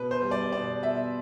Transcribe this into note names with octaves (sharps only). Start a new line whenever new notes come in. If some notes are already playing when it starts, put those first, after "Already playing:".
Already playing: B2 B4
C5
G3
D5
B2 D5
B2 E5